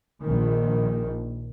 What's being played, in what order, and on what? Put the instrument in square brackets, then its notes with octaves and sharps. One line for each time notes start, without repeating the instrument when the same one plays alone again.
[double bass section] A#1 D#3